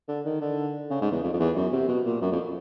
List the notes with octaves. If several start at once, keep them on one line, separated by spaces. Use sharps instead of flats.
D3
D#3
D3
C#3
G#2
E2
F2
F2
E2
F#2
C3
B2
A#2
F#2
F2